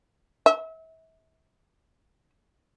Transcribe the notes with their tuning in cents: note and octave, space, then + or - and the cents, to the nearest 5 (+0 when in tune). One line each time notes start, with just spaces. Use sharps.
E5 -35